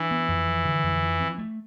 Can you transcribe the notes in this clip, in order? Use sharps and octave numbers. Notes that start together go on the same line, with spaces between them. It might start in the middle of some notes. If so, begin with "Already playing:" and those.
Already playing: E3 D4
B3
F2
F3
D3
F2
F3
C4
A3